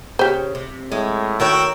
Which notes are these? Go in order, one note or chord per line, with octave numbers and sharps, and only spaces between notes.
C#3 G4 C5
C3
A2 G#3
D#3 F#4 A#4 C#5 G5 E6